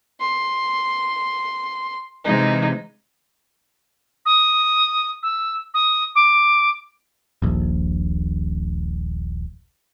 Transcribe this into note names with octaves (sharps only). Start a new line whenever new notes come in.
C6
C3 E3 G#3 D#4
D#6
E6
D#6
D6
D#1 A#1